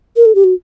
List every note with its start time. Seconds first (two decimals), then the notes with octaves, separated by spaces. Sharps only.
0.16 A#4
0.26 A4
0.35 G4
0.44 F#4